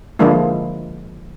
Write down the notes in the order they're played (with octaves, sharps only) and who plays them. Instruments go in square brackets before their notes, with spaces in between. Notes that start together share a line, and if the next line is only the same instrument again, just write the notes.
[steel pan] D3 F3 G#3 A#3 D4 E4